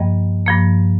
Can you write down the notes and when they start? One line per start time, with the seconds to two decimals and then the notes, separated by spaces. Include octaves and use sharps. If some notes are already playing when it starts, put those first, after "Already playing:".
Already playing: G2 F3 A#3 D#5 G5
0.46 G2 F3 A#3